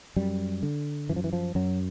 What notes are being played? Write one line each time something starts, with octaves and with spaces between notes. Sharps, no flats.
F#2 G3
D3
F#2 E3
F3
E3
F3
F#2 F#3